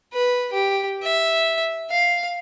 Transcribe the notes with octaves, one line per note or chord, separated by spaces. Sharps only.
B4
G4
E5
F5